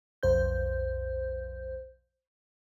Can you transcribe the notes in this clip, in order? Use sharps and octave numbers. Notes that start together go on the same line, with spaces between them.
B1 F2 C5 G6